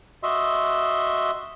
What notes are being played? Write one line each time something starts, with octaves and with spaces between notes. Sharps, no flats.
F#4 D#5 E5 C6